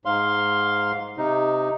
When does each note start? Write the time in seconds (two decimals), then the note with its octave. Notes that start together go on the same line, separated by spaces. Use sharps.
0.05 G#2 F5 C6
1.17 C3 D#4